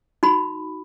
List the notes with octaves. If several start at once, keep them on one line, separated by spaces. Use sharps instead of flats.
D#4 F#4 B5